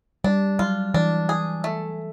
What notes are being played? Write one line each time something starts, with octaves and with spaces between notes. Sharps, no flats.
G3 D4
F#3 F4
E3 D4
G#4
A3